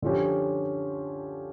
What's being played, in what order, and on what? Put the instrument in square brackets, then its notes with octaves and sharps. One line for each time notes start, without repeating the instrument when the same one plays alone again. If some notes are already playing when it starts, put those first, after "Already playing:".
[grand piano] D3 F3 C#4 G4